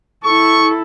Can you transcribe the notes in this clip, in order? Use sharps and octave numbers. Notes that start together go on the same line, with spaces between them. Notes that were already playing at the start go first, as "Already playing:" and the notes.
E4 A4 C#6